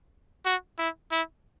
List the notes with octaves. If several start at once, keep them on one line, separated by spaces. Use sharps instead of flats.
F#4
E4
E4